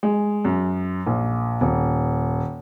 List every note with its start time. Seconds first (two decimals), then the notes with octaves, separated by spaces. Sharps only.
0.03 G#3
0.45 F#2
1.07 A#1
1.61 D#1